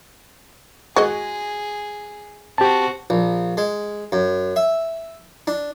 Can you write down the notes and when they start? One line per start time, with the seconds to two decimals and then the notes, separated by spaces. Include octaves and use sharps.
0.96 G#3 F#4 G#4 D#5
2.58 C4 F#4 G4 A5
3.10 A#1
3.57 G#3
4.12 F#2
4.56 E5
5.47 D4